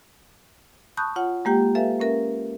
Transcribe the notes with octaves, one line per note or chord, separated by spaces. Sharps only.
A5 B5 C#6 D#6 F#6 G6
F4 C#5 F#5
G#3 A#3 G4 G5
A4 B4 E5 F5 G#5
A#3 C#4 A#4 E5